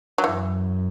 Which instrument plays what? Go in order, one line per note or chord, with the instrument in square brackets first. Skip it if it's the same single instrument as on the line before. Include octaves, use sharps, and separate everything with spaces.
[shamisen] F#3
[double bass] F#2 [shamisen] E3